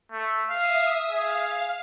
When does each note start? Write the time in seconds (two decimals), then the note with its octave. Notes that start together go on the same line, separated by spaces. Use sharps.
0.12 A3
0.49 E5 F5 D#6
1.10 G#4 F5